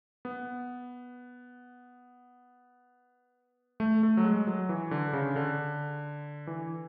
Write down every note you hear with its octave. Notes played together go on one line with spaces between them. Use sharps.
B3
A3
A3
F#3
G#3
F#3
E3
D3
C#3
D3
E3